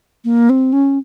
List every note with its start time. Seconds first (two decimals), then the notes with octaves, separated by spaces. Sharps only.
0.25 A#3
0.50 C4
0.73 C#4